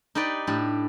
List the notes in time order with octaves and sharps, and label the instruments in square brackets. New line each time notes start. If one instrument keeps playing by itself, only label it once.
[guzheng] D#4 G4 B4 D5
A2 D4 G4